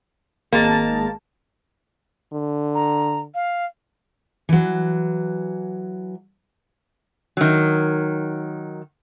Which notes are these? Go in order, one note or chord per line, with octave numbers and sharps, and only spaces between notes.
G#1 G#3 A#3 A5
D3
A#5
F5
E3 F#3
D#3 F#3